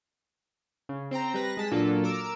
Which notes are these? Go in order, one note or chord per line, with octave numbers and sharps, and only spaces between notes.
C#3
C4 C5 G5 A#5
G3 B4 A#6
G#3 A5 B6
A#2 F#3 A#3 D4 F4 A4
A#4 D6 E6